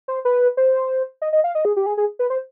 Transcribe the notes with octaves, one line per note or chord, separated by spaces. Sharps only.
C5
B4
C5
D#5
D#5
F5
D#5
G#4
G4
G#4
G#4
B4
C5